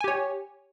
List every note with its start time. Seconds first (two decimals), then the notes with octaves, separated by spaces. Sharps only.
0.01 G#5
0.04 G4
0.08 C#5